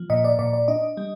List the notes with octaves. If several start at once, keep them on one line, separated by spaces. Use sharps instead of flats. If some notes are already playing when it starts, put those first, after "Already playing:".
Already playing: F3
A#2 D#5
D5
A#2 D5
D5
D4 D#5
G3